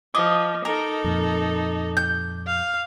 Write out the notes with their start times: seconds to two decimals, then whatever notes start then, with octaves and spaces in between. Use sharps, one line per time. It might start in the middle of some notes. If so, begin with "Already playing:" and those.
0.15 F3 D#5 D6
0.65 D#4 A4 A#4
1.04 F2 A#2
1.97 G6
2.47 F5